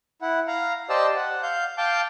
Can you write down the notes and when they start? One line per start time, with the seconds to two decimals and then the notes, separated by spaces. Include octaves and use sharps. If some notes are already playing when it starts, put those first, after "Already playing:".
0.22 E4 F#5
0.48 F5 A#5
0.89 G4 C5 D5 D#5 A5 E6
1.16 F#5
1.43 F5 G6
1.78 F5 G5 A5 D6 G6